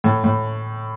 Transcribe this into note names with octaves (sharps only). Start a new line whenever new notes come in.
A2
A2